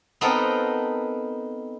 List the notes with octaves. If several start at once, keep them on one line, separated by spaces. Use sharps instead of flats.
B3 C4 D#4 A4 A#4